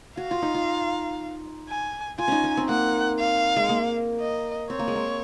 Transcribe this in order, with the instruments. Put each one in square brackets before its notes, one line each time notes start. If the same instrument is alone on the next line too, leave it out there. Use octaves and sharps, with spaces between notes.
[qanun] F#4 [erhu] F5
[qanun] F4
D#4
F4
[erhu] G#5
[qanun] F4 [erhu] G#5
[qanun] C#4 D#4
C#4
C4
[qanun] A#3 [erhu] F#5
[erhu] F5
[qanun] G#3
A#3
[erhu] D#5
[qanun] C4 [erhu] C#5
[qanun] A#3
G#3
A#3